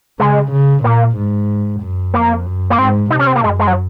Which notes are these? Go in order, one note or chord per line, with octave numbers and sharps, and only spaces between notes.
C#3 G#3
C#3
A#2 A#3
G#2
F#2
F2 A#3
F#2
A#3
G#2 C4
C3 D#4
C#4
C4
A#3
F#2 G#3
G#3
F#3